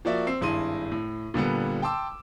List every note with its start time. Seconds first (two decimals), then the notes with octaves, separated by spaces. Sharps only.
0.05 F3 A#3 F#4 D5 E5
0.27 C4 E6 C7
0.41 G#1 G2 E4 G#4 C6 D#7
0.92 A2
1.34 A#2 D3 G3 B3
1.82 G5 A5 C6 D6 E6